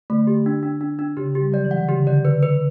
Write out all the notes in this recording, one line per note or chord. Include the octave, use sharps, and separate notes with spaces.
D3 A3
G4
D4
D4
D4
D4
C#3 G4
G4
G3
F#3 D5
E3
F#5
D3
C#3 G4
D3 D5
D3 B4
B4